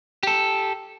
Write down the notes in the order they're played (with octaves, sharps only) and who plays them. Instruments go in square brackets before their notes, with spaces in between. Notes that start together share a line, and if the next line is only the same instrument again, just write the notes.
[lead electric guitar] G4 A4